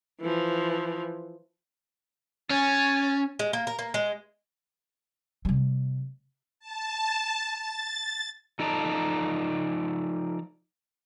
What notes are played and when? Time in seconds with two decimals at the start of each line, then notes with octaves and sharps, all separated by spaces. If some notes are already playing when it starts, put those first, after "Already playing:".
0.21 E3 F3
2.50 C#4 G#5 A6
3.39 G#3
3.53 A#3
3.67 A#4
3.79 A#3
3.94 G#3
5.45 C3 G3
6.60 A5
7.51 A6
8.59 F3 D#4 A4 D5 A5 A#5